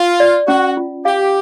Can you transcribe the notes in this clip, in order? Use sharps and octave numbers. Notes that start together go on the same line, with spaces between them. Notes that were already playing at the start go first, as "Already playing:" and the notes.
Already playing: F4
D5
C#4 F#4
F4
G4 F5